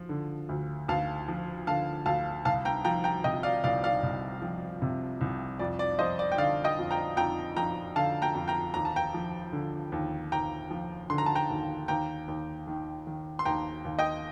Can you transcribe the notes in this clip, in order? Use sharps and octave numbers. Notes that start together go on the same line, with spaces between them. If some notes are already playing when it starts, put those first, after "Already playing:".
Already playing: F3
D3
D2
D2 F5 A5
F3
D3 F5 A5
D2 F5 A5
C2 F5 A5
G5 A#5
F3 G5 A#5
G5 A#5
C3 D#5 G5
D5 F5
C2 D5 F5
D5 F5
C2
F3
C3
C2
F2 D5
D5
F3 C5 D#5
D5
G5
D3 D5 F5
D#5 G5
F2
G5 A#5
F2 G5 A#5
F3 G5 A#5
D3 F5 A5
G5 A#5
F2
G5 A#5
D#2 A#5
A5
G5 A#5
F3
D3
D#2
D#2 G5 A#5
F3
D3 C6
A#5
A5
G5 A#5
D#2
D#2 G5 A#5
D#2
D#3
D#3
C6
D#2 G5 A#5
D#2
D#5 G5